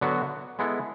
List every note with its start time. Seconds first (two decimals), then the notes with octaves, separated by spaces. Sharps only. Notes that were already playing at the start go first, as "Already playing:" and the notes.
0.01 D3 F#3 B3 F#4
0.59 G#3 B3 E4 A4